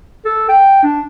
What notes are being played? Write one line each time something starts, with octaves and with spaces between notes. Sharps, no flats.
A4
G5
D4